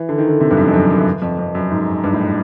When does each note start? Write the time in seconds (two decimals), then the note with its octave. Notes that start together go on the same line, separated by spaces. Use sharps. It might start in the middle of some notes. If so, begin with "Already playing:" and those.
Already playing: E3
0.09 D3
0.18 D#3
0.28 D3
0.41 C3
0.51 G2
0.57 F#2
0.68 F2
0.74 F#2
0.90 F#2
1.22 F2
1.39 F2
1.55 F#2
1.72 G#2
2.04 G2
2.13 A2